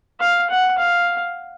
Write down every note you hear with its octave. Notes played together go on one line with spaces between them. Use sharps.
F5
F#5
F5